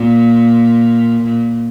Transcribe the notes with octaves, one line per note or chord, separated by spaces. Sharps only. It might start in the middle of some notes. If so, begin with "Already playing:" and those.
Already playing: A#2
A#2